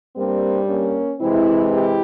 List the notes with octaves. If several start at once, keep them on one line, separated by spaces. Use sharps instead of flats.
G2 G3 A#3 C4
A#3 C#4
C3 E3 G#3 C4 E4
E4 G4